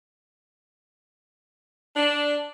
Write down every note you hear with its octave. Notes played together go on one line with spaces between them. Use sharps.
D4